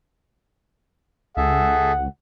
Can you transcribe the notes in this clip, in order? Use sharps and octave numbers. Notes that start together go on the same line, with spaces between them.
C#2 G#4 A4 E5 F#5